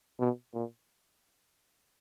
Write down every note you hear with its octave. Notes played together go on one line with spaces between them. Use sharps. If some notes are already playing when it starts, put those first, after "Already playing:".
B2
A#2